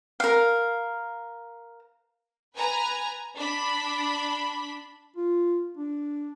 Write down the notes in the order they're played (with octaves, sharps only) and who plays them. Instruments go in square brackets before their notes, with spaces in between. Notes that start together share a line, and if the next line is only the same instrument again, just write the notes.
[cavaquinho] A#4 F5
[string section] B4 G#5 A#5
D4 B5
[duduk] F4
D4